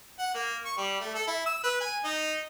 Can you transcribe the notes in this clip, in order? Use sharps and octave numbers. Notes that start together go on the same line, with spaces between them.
F#5
A#3
C#6
G3
A3
A4
E4
E6
B4
G#5
D#4